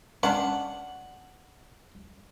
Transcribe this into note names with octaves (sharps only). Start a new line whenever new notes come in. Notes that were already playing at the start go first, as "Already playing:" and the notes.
C#4 D4 F#5